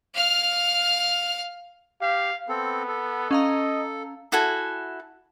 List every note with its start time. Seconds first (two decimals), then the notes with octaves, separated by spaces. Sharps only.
0.14 F5 F6
2.01 G4 F5
2.49 B3 C4 A4
2.88 A4
3.31 C#4 D#5 F5 A#5
4.32 E4 F#4 A4 G#5